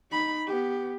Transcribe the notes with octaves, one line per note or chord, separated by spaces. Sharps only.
D#4 B5
B3 G4